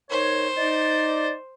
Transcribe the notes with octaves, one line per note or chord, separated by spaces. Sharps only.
D#3 D#4 C5 C#5
D#4 D5